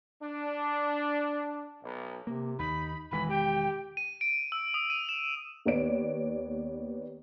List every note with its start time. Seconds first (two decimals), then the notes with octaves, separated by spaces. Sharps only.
0.22 D4
1.83 B1
2.27 C3 A#3
2.59 D#2 D#4 B5
3.11 E1 D#3 E3 G#3 B5
3.29 G4 G5
3.97 D#7
4.21 D7
4.52 E6
4.74 D#6
4.90 D#7
5.09 E7
5.65 D#2 B3 C#5 D5 D7